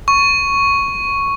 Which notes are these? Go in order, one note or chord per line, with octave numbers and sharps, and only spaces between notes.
C#6